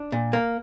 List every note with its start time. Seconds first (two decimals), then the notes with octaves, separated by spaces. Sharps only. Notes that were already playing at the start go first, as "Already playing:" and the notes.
Already playing: D4
0.12 A#2
0.33 A#3